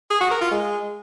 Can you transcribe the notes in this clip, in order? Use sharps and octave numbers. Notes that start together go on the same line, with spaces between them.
G#4
F#4
A#4
F4
G#3